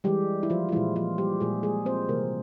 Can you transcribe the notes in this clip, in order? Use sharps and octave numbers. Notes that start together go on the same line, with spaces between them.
E3 G3 G#3 G4
E4
F3 F4
F4
A#2 E3 G#3 E4
F3 F4
G3 G4
A#2 G#3 G#4
G#3 G#4
C4 C5
C3 E3 G3 A#3 A#4